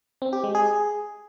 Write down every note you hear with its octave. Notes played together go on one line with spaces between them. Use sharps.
C4
G4
G#3
G#4